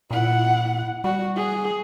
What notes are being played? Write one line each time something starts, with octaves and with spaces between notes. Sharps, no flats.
A#2 E4 F#5
G3 F#4
G#4